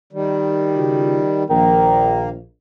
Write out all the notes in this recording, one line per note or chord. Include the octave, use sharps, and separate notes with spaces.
D#3 G3
C#3 F4 F#4
A#1 D#3 A#3